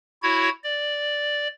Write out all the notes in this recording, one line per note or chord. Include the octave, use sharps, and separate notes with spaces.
E4 F#4 C#5 G#6
D5